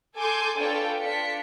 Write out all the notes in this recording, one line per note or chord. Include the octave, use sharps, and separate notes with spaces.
G#4 A4 G#5 C6 D6 G6
D4 F4 A4 B4 C#5 G5
D4 F4 B6 C#7